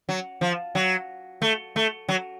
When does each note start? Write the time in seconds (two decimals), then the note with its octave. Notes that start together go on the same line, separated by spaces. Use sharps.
0.09 F#3
0.41 F3
0.75 F#3
1.42 A3
1.76 A3
2.09 F#3